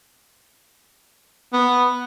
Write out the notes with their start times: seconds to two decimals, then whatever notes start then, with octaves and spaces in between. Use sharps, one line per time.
1.53 B3